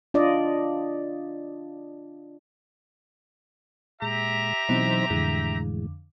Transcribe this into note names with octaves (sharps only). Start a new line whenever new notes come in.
D4 F4 D5 D#5
A#2 G#3 G4 E5 A#5
B2 E3 F#3 C4 D#4 C5
F2 A2 D3 E3 G#3